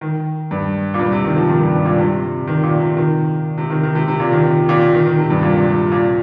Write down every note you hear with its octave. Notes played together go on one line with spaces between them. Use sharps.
D#3
G2
A#2
G2
C3
D#3
F3
D#3
G2
G2
A#2
C3
D#3
A#2
C3
D#3
C3
D#3
D#3
C3
C3
A#2
D#3
D#3
A#2
D#3
D#3
C3
G2
A#2
C3
A#2